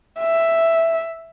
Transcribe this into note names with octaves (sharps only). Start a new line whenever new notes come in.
E5